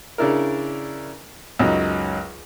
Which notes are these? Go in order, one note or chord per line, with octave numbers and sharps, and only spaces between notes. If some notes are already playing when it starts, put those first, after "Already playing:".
C#3 D4 E4 A#4
C#2 F#2 D#4